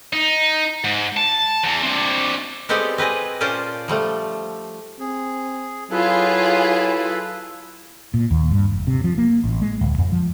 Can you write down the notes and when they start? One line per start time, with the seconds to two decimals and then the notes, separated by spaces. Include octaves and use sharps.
0.13 D#4
0.84 G#2
1.17 A5
1.64 E2
1.83 C4 D4
2.69 G#3 B3 C4 G4 A4 D5
2.98 C4 B4 D#5 G#5
3.40 A#2 C#4 F4 C5 D5 A5
3.88 F3 G3 A3
5.00 C4 G#4
5.91 F#3 E4 F4 G#4 A4 B4
8.14 A#2
8.31 D#2
8.51 G2
8.73 F1
8.87 C3
9.04 F3
9.18 A#3
9.44 A1
9.62 G#3
9.81 D1
9.98 F2
10.12 F3